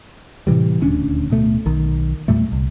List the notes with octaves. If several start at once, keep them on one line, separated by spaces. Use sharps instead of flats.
A2 C3 E3 G3
D#1 D2 C#4 D4
D1 B2 A3
B1 D#3
E2 A#2 G3 A3
C2